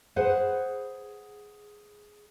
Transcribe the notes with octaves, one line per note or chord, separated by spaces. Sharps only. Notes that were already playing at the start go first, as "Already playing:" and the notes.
G#4 B4 C5 F#5